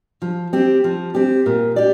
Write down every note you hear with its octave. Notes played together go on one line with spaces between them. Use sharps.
F3
C4 G4
F3
C4 G4
A#2
G4 D5